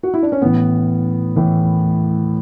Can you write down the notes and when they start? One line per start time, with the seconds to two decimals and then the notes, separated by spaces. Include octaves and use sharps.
0.03 F#4
0.14 E4
0.23 D4
0.32 C#4
0.42 A2 E3 B3
1.36 A2 E3